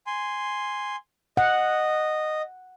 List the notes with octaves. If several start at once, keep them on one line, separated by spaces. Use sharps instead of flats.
G#5 C6
D#5 F#5